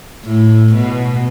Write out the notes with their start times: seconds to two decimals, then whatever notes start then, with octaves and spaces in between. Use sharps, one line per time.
0.25 A2
0.74 B2